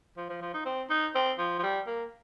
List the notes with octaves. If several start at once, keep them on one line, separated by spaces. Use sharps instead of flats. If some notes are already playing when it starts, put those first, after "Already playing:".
F3
F3
F3
D#4
C4
D#4
C4
F3
F3
G3
A#3